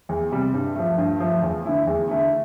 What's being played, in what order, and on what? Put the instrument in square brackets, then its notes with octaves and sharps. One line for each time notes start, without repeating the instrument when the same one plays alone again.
[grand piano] E2
C3 G3
G2
F3 A3
G2
F3 A3
E2
D3 A3 E4
E2
D3 A3 E4